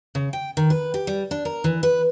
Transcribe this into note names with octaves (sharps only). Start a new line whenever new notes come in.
C#3
G5
D#3
B4
G4
G3
D4
A#4
E3
B4